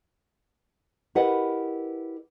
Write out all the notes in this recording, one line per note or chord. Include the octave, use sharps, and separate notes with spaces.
E4 G4 A#4 B4 D#5 F#5